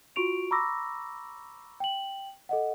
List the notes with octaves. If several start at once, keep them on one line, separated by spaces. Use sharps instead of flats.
F4 F#4 C#6 D7 F7
A#5 B5 C#6 D6 E6 A#6
G5 F#7
A4 D#5 F#5